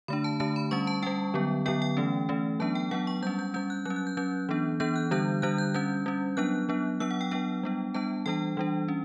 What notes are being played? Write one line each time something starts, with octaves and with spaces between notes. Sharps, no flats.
D3 A3 D4 B5
A5
D3 A3 D4 A5
B5
G3 C#4 C#6
A5
G3 C#4 G5
D3 F#3 B3
D3 F#3 B3 G5
G5
E3 A3 C#4
E3 A3 C#4
F#3 B3 D4 A5
G5
F#3 B3 D4 F#5
C#6
G3 C#4 G6
G6
G3 C#4 G6
F#6
F#3 C#4 F#6
F#6
G6
F#3 C#4 G6
E3 B3 D4
E3 B3 D4 G6
F#6
D3 G3 D4 G6
D3 G3 D4 F#6
G6
G3 C#4 G6
G3 C#4
F#3 B3 D4 F#6
F#3 B3 D4
F#3 B3 D4 E6
F#5
G5
F#3 B3 D4 G5
G3 B3 D4
G3 B3 D4 A5
E3 G3 D4 G5
E3 G3 D4
C#4